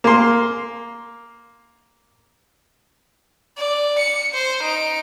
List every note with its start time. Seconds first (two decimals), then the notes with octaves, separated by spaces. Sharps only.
0.04 A#3 C6
3.57 D5
3.98 C#7
4.34 C5
4.63 D#4 D7